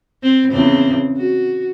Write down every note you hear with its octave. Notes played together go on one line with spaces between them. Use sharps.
C4
E2 C#3 C4
F#4